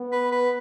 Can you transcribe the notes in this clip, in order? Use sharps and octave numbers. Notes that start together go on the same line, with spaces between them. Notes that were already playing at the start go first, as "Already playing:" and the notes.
Already playing: B3
B4
B4